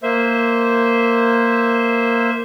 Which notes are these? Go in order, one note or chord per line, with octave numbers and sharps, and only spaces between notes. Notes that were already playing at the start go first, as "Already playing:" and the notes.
A#3 C5 E5